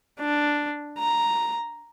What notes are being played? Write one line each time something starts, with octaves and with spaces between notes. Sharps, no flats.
D4
A#5